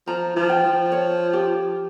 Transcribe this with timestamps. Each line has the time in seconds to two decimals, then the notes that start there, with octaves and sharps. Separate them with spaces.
0.07 F3 A#5
0.36 F3
0.50 G5
0.64 F3
0.92 C#5
1.33 G4